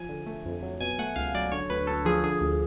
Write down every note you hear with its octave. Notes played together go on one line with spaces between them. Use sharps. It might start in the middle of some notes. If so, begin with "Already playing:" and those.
Already playing: F3 G#5
D3
A3
F2
F#3
B2 G#5
A3 F#5
C#2 F5
F#3 D5
D3 C#5
D2 B4
D2 A4
F3 G#4
D3 G#4
D2